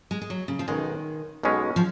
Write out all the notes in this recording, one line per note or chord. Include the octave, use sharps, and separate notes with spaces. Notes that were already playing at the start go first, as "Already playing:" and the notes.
G#3
G#3
F#3
C#3
F3
B1 B2 D#3 G#3 C#4
B1 B2 G#3 C#4
F3